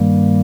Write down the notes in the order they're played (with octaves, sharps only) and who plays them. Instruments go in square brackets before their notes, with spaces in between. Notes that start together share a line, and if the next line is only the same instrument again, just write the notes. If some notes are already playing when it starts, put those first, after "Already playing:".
Already playing: [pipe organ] G2 D#3 G3 A#3